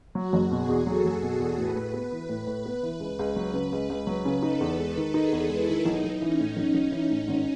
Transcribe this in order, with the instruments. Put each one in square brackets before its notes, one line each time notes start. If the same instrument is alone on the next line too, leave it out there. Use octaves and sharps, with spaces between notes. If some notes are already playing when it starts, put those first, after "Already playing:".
[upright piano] F#3 [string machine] F#4
[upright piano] F#1
[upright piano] B2 [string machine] G#4
[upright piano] E2
[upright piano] F#3 [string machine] A4
[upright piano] F#1
B2
E2
[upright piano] A2 [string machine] B4
[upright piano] A2
B3
E3
A2
A2
B3
E3
C#2
C#2
F#3
C#3
C#2
C#2
F#3
C#3
[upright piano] D#4 [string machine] A4
[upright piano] E2
G#3
D#3
[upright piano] D#4 [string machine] G#4
[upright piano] E2
[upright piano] G#3 [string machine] E4
[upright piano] D#3
[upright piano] B1 [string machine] D#4
[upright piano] B1
[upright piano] E3 [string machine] C#4
[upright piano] A2
[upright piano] B1 [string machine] C#4
[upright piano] B1
E3
A2
G#1